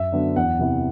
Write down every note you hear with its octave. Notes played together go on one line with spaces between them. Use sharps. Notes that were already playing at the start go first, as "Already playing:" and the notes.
Already playing: F#2 E5
D3 F#3 B3
E2 F#5
C3 E3